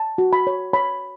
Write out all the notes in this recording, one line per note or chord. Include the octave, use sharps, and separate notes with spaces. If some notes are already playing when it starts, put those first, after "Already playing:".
Already playing: A5
F#4
B5
C#5
C#5 B5